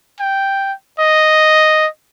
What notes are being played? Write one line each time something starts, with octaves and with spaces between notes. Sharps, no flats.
G5
D#5